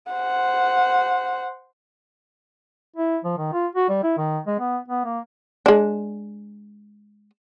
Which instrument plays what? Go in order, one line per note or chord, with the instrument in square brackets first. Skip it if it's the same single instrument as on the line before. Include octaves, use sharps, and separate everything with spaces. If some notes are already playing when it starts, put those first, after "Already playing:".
[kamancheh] C5 F#5
[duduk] E4
F3
D#3
F4
F#4
G3
E4
D#3
G#3
B3
B3
A#3
[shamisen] G#3 D4